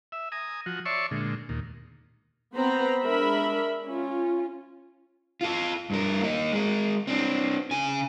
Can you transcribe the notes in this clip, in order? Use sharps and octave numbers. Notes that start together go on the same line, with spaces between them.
E5
G#5 A#5 D#6
F3 F#4
C#5 D5 E5 A5 C6 C#6
A#2 D3 G#3
D#2 A#2
B3 C4 C5 A#5 B5
G#3 D4 A#4 E5 B5
C#4 F4
F4 A4
G2 A#4
A#3 D#4
G#3 A#4
C4 D4
C#3 G#5